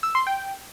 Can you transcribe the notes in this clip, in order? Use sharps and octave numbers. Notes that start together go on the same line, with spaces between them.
E6
C6
G5